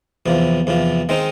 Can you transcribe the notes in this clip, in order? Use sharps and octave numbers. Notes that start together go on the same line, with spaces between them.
E2 C3 F3
E2 C3 F3
D#3 G#3 C4 D#4